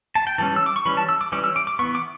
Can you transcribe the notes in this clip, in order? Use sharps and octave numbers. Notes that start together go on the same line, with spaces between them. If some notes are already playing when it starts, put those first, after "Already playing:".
A5
G5
E3 G3 C#4 A5
E6
D6
C#6
E3 G3 C#4 B5
A5
E6
D6
E3 G3 C#4 D6
E6
D6
D6
E3 B3 C#6
D6